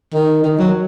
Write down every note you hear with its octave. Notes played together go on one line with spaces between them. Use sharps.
D#3
D#3
F#3